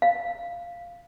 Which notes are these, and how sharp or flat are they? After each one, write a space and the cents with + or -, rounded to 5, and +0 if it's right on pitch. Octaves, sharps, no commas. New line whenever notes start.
F5 -5